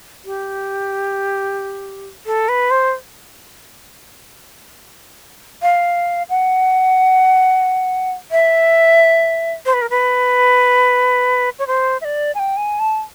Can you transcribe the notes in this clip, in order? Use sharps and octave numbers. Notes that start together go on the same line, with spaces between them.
G4
A4
B4
C5
F5
F#5
E5
C5
B4
A#4
B4
C#5
C5
E5
D5
G#5
G5
G#5
A5